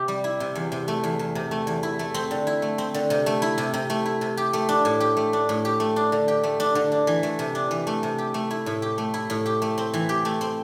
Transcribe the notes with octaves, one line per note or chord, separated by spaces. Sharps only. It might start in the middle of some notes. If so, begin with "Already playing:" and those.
Already playing: C3 G4
G3
E4
C3
E2
C3
A3
E2
E2
C3
A3
E2
E4
A3
C4
D3
E4
A3
C4
D3
C3
A3
E4
C3
C3
A3
E4
C3
G4
A3
D4
A2
G4
A3
D4
A2
G4
A3
D4
D3
G4
A3
D4
D3
D4
E3
A3
C3
D4
E3
A3
C3
G4
A3
E4
A2
G4
A3
E4
A2
G4
A3
C4
E3
G4
A3
C4